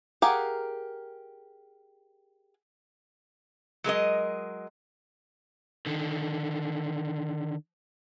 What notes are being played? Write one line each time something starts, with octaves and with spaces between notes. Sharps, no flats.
G4 G#4 A#4 F5 F#5
F#3 G#3 A#4 D#5
D3 D#3